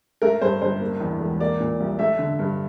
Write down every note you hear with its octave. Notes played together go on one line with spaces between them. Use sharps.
A3 A#4
G2 C5
G1 C5
A#3
E2
E1
A#3 D5
A#2
C2
A3 E5
D3
G2